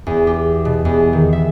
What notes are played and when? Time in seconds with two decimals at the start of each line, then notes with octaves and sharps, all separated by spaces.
0.07 E2
0.27 G4
0.65 B2
0.85 E2
1.13 D#3
1.33 E5